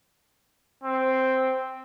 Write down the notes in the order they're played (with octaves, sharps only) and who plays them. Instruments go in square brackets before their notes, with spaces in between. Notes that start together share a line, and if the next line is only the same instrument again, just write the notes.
[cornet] C4